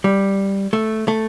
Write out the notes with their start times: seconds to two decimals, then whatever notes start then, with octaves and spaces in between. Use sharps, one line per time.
0.04 G3
0.73 A3
1.08 A3